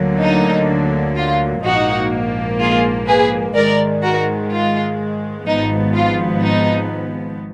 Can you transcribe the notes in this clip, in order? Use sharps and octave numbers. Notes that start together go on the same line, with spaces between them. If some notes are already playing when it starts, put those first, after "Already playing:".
Already playing: D2 D3 F#3 A#3
D#4
F4
A#1 G#2 F3 A#3 D#4 F#4
F4 G#4
G#4 B4
G#2 D#3 G#3 A#4 D5
F#4 A#4
F4
G#1 G#2 F3 B3 D#4
F4
D#4